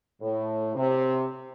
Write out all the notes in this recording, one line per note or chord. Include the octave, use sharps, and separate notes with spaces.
A2
C3